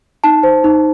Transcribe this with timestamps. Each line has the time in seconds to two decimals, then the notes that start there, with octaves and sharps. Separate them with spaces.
0.24 D#4 A5
0.43 C5
0.64 D#4